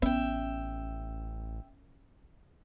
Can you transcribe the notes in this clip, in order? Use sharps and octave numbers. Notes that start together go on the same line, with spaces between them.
A1 B3 C#4 E5 G5